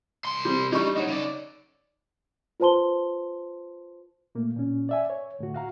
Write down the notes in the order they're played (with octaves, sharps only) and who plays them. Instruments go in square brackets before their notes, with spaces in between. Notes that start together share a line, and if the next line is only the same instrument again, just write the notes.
[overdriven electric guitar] C2 C6
[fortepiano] G3 C4
[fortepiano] G3 C#6 [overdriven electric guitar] D4 D#4
[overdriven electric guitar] F#2 F#3 [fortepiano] D#4 C#5
[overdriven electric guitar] C#3 D5
[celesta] F4 B4 C5 A5 C6 G7
[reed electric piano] A#2 A3 A#3
A#2 C#4
D5 E5 G#5
C#5
D2 A2 D3 F#4
F#4 F5 A#5